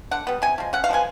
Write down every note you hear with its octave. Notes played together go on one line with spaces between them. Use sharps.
D3 F#5
G3 B3
C3 G#5
F3 G#3
C#3 F#5
F5
F3 G#3 B3 G#5